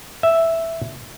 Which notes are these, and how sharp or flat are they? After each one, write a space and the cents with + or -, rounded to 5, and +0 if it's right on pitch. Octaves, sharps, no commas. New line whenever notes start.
E5 +0